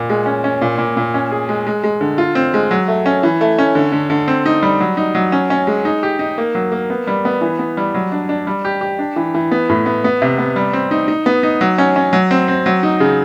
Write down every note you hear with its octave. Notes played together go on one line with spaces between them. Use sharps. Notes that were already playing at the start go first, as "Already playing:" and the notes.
Already playing: A#2
G#3
C#4
C#4
A#2
A#2
A#2
C#4
G#4
G#3
G#3
G#3
D3
F4
C4
G#3
F#3
A3
C#4
E3
A3
C#4
D3
D3
D3
C4
D#4
G3
F#3
D#4
F#3
C#4
C#4
G#3
D#4
G4
D#4
A#3
F#3
A#3
B3
G3
B3
E3
B3
G3
F#3
D4
D4
G3
G4
G4
D4
E3
E3
B3
A2
B3
B3
C3
B3
G3
C4
D#4
D#4
B3
D#4
F#3
C#4
C#4
F#3
C4
C4
F#3
D#4
C#3